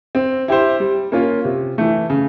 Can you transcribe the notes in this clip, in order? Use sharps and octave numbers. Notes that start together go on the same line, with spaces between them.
C4
E4 G4 C5
G3
A#3 C#4 F4
C3
E3 A3
C#3